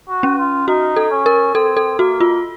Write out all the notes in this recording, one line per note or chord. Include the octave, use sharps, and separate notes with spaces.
F#4
C#4
F4
D#4 F#4
A4
C#4
A#4
C4 A4
A4
A#3 F#4
F4